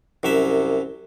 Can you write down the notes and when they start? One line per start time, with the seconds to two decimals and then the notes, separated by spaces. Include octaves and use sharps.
0.23 C2 F#2 F#3 E5